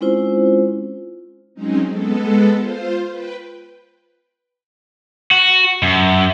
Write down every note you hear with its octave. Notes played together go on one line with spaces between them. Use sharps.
G#3 C4 C#4 E4 F4 C5
F#3 G#3 C4 C#4 D#4
G#3 B3 A4
F4 C5
B4 G5
F#4
F#2